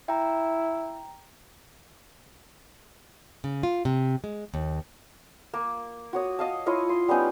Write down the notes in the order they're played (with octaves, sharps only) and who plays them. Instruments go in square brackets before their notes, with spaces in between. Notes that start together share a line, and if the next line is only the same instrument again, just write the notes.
[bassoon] E4 [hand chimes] G5 A#5
[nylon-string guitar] C#3
F4
C3
G#3
D#2
[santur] A#3
F#4 C#5 D#6
D#5 F5 A5
E4 F4 C#5 D#5
C6
G3 B3 C#4 D#4